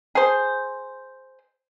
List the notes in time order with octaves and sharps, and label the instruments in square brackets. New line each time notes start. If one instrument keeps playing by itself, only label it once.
[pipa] G#4 C5